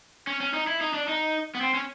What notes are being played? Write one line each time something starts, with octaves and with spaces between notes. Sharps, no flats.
C#4
C#4
D#4
E4
D#4
D4
D#4
B3
C4
C#4